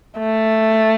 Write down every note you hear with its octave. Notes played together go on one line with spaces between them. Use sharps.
A3